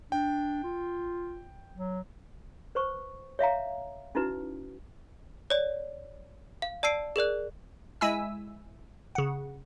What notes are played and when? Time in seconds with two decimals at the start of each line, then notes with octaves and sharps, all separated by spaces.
0.12 D4 G5
0.64 F4
1.75 F#3
2.75 B4 C5 C#6
3.39 C#5 E5 F5 A#5
4.15 C#4 D#4 E4 F#4 B4
5.50 C#5 D5
6.62 F5
6.83 D5 A5 E6 C7 D7
7.16 G#4 A#4 D5 F#6
8.01 G#3 E4 E5 G#5 E6
9.15 C#3 F#5